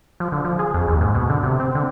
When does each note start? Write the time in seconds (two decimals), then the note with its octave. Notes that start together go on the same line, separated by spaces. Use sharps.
0.20 F3
0.32 D3
0.45 F3
0.59 G#4
0.74 F2
0.88 D#2
1.01 G#2
1.15 B2
1.30 D3
1.43 C3
1.60 C4
1.75 D3